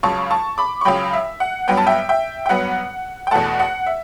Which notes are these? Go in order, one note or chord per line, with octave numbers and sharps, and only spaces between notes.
C#2 C#3 F#3 A5 C#6
A5 C#6
B5 D6
C#6
C#2 C#3 F#3 G5 B5
E5
F#5
G2 F#3 B3 G5
A5
E5 G5
E5 G5
G5
G2 F#3 B3 F#5
G5
E2 B2 A3 F#5 A5
F#5
E5